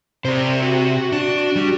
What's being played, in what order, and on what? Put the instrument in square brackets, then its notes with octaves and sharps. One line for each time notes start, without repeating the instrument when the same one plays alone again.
[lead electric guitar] C3 [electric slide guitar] C5 D5
[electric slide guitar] F#4
[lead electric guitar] D4
G3